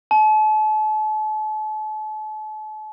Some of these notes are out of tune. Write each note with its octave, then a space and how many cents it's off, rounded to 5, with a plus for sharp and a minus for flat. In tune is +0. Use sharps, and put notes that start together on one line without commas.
A5 -40